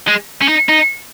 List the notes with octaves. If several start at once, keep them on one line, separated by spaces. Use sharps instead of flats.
G#3
C#4
D#4
D#4